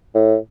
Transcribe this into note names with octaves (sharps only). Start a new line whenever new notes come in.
A2